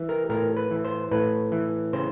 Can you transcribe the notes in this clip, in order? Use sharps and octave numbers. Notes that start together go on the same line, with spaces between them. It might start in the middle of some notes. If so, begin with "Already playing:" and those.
Already playing: E3
A#4
A2 A#4
B4
E3
C5
A2 B4
E3
C#3 C5